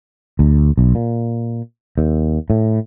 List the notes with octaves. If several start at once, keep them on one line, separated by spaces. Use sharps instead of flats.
D2
B1
A#2
D#2
A2